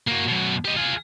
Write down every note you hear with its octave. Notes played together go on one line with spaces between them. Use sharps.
A#3 F#4
F#2 B2
G4 D#5
F4 G#4